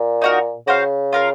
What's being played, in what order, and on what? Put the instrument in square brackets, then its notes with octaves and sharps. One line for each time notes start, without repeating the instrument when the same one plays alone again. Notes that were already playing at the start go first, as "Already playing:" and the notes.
Already playing: [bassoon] A#2
[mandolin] D#4 F#4 A#4
[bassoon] C#3 [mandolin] F#4 C5 F5
[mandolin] F4 A#4 F5